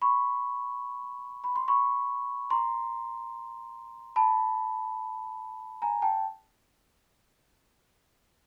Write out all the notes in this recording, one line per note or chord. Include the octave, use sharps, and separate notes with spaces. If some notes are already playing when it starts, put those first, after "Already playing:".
B5 C#6
B5
C6
B5 C#6
A#5 C6
A5 B5
G#5 A#5
G5 A5